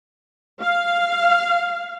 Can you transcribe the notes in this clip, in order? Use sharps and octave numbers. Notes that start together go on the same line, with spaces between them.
F5